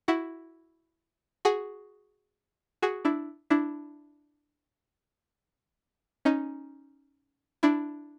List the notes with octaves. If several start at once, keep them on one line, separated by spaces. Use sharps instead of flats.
E4 F#4
F#4 G#4
F#4 G#4
D4 E4
D4 E4
C#4 D#4
D4 E4